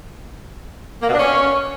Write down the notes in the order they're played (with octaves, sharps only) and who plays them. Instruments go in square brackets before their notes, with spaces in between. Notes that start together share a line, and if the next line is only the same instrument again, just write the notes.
[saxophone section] A#3
B2
D4
C#4